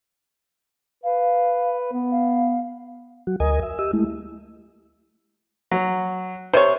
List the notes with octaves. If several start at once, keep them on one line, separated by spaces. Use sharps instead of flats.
B4 F5
B3
F5
F#3 F#4
D2 A#4 D#5 G#5 D#6
E5
G4 D#5 E6
G#3 A3 E4
F#3
C3 C5 C#5